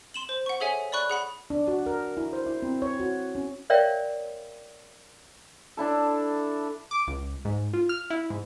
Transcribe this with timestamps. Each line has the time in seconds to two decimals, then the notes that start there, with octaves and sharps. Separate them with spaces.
0.14 C6 E7 F#7
0.29 C5
0.46 F#5 C#6
0.60 G#4 A4 C#5 E5 F#5 G#5
0.92 D5 B5 C#6 F#6
1.10 G#4 F#5 B5
1.50 D4
1.68 F#4
1.86 A#4
2.17 E4
2.33 C5
2.46 E4
2.62 C4
2.82 C#5
3.00 F#4
3.35 C#4
3.70 A#4 C#5 D5 E5 F5 G5
5.77 D4 E4 A4
6.91 D6
7.07 C#2
7.45 G#2
7.73 F4
7.89 F6
8.10 E4
8.30 G#2